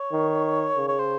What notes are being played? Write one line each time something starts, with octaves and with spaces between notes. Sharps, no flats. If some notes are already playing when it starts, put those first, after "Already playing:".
Already playing: C#5
D#3
C#3
C#5
C5